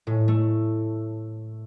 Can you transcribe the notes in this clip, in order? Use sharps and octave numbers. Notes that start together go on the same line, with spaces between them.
A2
A3